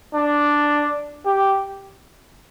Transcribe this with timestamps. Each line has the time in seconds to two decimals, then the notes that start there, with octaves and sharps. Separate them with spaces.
0.14 D4
1.26 G4